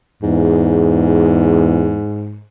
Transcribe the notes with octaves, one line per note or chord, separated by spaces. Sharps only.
E2 G#2